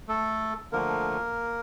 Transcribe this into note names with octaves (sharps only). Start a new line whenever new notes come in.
A3 A4
D3 F3 A3 A#3 A#4